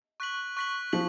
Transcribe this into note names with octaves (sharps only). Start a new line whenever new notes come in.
C#6 F#6 B6 F#7
C#6 F#6 B6 F#7
F3 F#6 B6 F#7